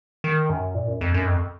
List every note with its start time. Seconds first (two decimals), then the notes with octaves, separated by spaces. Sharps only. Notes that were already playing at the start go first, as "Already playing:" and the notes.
0.24 D#3
0.50 F#2
0.75 A#2
0.88 F#2
1.01 F2
1.14 F#2
1.27 F2